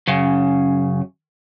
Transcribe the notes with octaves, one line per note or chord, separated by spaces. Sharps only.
F#2 C#3